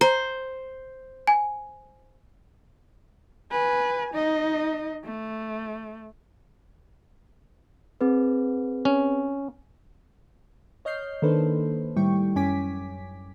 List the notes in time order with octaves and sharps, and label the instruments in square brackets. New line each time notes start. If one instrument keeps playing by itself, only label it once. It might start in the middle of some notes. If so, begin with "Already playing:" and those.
[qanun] C5 [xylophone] A#5
[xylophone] G#5
[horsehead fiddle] B4 G#5
D#4 D#5
A3
[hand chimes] C4 G#4 B4
[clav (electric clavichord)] C#4
[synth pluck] C#5 D#5 F6 G6 C7
D#3 A#3 D4 A4 B4 C5
A2 D#3 G3 E4 G5 C#6
F#2 C#4 G#5 D6 B6